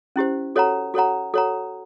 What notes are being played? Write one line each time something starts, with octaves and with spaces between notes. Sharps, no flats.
C#4 E4 G4 C5
F#4 A4 C#5 F#5 A#5
F#4 A4 C#5 F#5 A#5
F#4 A4 C#5 F#5 A#5